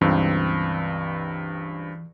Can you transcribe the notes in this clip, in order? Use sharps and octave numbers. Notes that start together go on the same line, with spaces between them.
C#2 G2 E3 C4